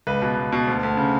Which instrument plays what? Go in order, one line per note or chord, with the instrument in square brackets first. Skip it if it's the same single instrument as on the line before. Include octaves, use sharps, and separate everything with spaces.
[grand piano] C#2 B4
B2
C#2
B2
D2
D2
C#3